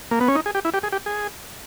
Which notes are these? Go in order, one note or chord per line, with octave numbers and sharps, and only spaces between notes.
A#3
B3
C#4
D#4
G#4
G4
E4
G4
G#4
G4
G#4